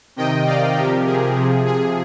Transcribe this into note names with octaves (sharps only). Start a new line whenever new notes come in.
C3 D#3 D#5 G5
D5 F5
C3 F3 G4 A#4
G#4
C3 F3
G#4